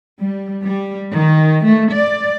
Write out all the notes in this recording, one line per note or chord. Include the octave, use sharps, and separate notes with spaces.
G3
G3
D#3
A3
D5